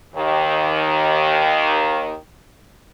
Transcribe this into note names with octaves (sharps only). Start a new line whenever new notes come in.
D#2 D#3